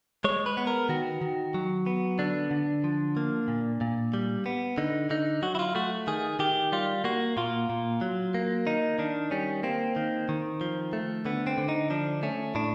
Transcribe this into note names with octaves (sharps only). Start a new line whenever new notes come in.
G#3 C#5
B4
B3
A#4
D#3 F#4
D#3
F#3
B3
D3 D4
D3
F3
A#3
A#2
A#2
G3
B3
D3 D#4
D3 D#4
F#3 F#4
E4
F4
A3 F#4
D#3 G#4
D#3 G4
G3 F4
A#3 F#4
A#2 F4
A#2
F#3
A#3
D#3 D#4
D#3 D4
G3 C#4
A#3 C4
D#3
D#3
F3
A3
D3 B3
C4
D3
D#4
F3 D4
A3 C#4
A2 D4